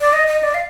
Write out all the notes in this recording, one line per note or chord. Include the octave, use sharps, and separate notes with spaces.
D5
D#5
D#5
D5
F5